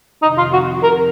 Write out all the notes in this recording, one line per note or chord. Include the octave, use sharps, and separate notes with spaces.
F2 C3 D#3 D#4
F4
F#4
A#4